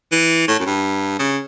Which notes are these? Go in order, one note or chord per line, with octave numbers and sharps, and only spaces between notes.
E3
A2
F#2
G2
C#3